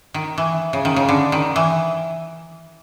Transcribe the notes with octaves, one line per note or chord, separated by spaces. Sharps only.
D#3
E3
C#3
D#3
C#3
D3
D#3
E3